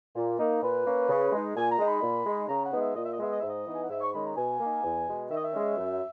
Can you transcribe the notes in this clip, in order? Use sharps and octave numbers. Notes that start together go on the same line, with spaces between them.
A#2
A#3 D#4
A#2 B4
A#3 C#4
C#3
G#3 D#4
A#2 G#5
A#5
G#3 D#4
B5
A#2
G#3 D#4
C#3 A#5
F#5
G#3 B3 D#4
E5
A#2 D#5
E5
D#5
G#3 B3 E5
D#5
G#2 E5
D#5
E3 B3 D#4
G#5
F#5
G#2 E5
C#6
D#3 G#3 C#4 B5
A#5
B2 G#5
A#3 D#4
E2
B2 G#3
D#3 E5
D#5
E5
G#3 C#4
F#2